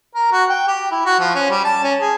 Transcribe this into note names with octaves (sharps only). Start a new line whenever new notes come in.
A#4
F#4
G5
G4
E4
F#4
F3
C#4
G3
A5
C#4
G#4